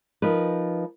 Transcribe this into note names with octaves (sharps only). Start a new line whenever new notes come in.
F3 D#4 A#4 B4